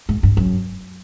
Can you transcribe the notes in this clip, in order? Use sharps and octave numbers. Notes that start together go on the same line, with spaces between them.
G#2
G2
F#2